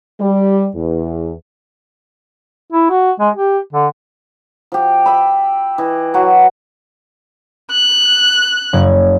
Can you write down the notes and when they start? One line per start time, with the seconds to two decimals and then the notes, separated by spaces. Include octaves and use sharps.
0.20 G3
0.75 E2
2.73 E4
2.90 F#4
3.20 G#3
3.35 G4
3.73 D3
4.72 F3 G4
5.06 E5 B5
5.78 E3 D#5
6.14 F#3 F#4 A5
7.71 F#6
8.73 F#1 G#6